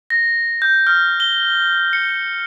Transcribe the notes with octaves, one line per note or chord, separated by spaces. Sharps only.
A#6
G6
F6
G7
C#7